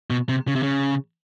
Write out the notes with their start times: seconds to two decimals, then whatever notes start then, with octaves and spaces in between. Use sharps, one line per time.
0.10 B2
0.29 C3
0.48 C#3
0.55 C3
0.63 C#3